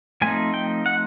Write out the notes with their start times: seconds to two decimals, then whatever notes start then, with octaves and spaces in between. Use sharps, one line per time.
0.22 F3 A3 C4 D#4 G#5
0.54 G5
0.86 F#5